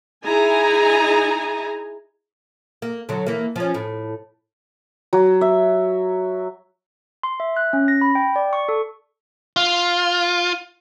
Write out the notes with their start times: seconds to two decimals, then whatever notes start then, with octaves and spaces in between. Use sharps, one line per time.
0.24 D#4 E4 G#4 G#5 A#5
2.82 A#3
3.09 D3 F#3
3.26 E3 A#3
3.56 F3 C#4
3.74 A2
5.13 F#3
5.41 E5
7.23 C6
7.40 E5
7.57 F#6
7.73 C#4
7.88 A#6
8.01 B5
8.15 G5
8.36 D5
8.53 C#6
8.69 A4
9.56 F4